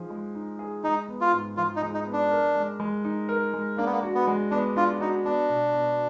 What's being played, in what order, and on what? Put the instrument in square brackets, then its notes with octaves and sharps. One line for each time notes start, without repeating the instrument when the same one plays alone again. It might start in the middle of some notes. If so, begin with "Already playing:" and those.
Already playing: [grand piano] F3 D#4 G#4
G#3
D#4
G#4
[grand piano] G#3 [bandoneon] D#4
[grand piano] B3
[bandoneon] F4
[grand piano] G#2
[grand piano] F3 [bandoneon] F4
[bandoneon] D#4
[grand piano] G#3
[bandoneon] D#4
[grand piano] B3
[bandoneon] D4
[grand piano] A#4
G#3
G#3
D#4
A#4
G#3
[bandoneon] A#3 [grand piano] D4
[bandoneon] B3
A#3
[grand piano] F#4
[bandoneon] B3
[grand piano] G#3
[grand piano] B3 [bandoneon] D4
[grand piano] D4 [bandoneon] F4
[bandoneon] D#4 [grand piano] F#4
[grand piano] B3 [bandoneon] D4
[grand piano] B2
B2